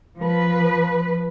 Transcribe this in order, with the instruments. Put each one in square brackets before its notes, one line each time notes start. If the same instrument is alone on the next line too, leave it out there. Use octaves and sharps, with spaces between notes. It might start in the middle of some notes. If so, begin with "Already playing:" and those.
[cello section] F3 B4